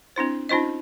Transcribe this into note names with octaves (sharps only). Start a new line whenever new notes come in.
C4 D4 E4 C5
C#4 D#4 F4 C5 D#5